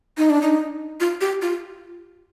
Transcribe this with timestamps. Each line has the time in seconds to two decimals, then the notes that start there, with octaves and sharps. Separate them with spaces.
0.18 D#4
0.30 D4
0.42 D#4
1.00 F4
1.21 G4
1.42 F4